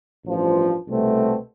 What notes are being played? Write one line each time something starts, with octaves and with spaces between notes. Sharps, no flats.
A1 G2 F3
C2 B2 A3 C4